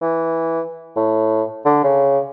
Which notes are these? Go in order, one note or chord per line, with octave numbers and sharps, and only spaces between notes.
E3
A2
D3
C#3